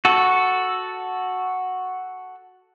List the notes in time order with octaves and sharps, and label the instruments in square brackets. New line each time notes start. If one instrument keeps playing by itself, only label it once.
[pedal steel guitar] F#4 A4